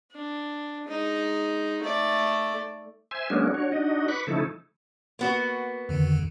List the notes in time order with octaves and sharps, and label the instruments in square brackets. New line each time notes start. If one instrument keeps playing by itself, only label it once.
[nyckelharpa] D4
G#3 D#4
A3 D5
[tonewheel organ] C5 E5 G#5
F#3 G#3 A#3 B3 C#4 D4
D4 F#4 C#5
D4 D#4 F#4 D#5
B4 B5 C#6 D6
C#3 F3 A3 D#4 E4 A4
[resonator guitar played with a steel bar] A#3 B3 F#4
[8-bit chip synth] F2 D3 D#3